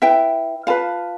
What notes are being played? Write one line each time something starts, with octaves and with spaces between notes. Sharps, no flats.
E4 B4 E5 G5
F4 B4 F5 A5